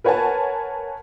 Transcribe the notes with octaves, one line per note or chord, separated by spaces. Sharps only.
A#4 B4 C#5 F#5 G#5 A5